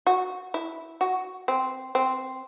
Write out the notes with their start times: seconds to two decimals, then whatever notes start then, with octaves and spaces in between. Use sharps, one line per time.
0.07 F#4
0.54 E4
1.01 F#4
1.48 C4
1.95 C4